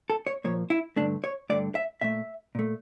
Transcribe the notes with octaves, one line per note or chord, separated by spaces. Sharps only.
A4
C#5
A#2 F3 A#3 C#5
E4
G2 D3 A3 D4
C#5
G2 D3 A3 D5
E5
A#2 A3 E5
A#2 A3